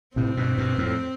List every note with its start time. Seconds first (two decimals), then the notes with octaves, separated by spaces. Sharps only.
0.16 A2 C3 C4
0.37 G2 B2
0.58 G2 B2
0.78 F2 A2